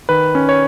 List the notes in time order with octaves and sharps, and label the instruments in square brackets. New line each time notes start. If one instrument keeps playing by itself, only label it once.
[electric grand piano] D#3 B4
C#4
C#5